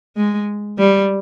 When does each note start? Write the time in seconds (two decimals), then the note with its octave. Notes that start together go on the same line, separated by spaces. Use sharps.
0.17 G#3
0.78 G3